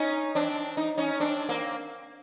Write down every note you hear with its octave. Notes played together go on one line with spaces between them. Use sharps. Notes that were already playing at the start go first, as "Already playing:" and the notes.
Already playing: C#4 D#4
C4 D4
D#4
C#4 D#4
C4 D4
A#3 C4